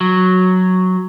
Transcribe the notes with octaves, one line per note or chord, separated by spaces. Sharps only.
F#3